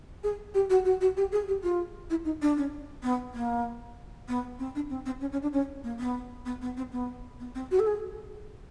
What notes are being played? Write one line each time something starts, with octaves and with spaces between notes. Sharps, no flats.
G#4
G4
F#4
F#4
F#4
G4
G#4
G4
F4
E4
D#4
D4
C#4
B3
A#3
B3
C4
D4
C4
C4
C#4
C#4
D4
C#4
A#3
B3
B3
B3
C4
B3
B3
C4
F#4
A4
G#4